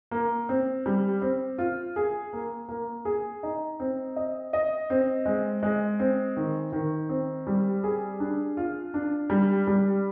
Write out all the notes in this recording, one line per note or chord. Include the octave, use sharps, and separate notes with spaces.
A#3
C4
G3
C4
F4
G#4
A#3
A#3
G#4
D#4
C4
D#5
D#5
C4
G#3
G#3
C4
D#3
D#3
C4
G3
G#4
D4
F4
D4
G3
G3